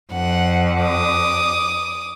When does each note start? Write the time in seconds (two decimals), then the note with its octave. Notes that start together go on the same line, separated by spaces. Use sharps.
0.13 F2 F#5
0.82 D6 D#6